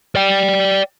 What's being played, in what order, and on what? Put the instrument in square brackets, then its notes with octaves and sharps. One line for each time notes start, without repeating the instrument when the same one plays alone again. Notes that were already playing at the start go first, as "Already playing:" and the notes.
[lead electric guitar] D5 G5